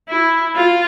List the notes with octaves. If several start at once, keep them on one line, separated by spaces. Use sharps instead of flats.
E4
F4